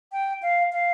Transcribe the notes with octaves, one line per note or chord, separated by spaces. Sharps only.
G5
F5
F5